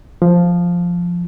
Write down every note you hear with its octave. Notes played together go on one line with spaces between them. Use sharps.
F3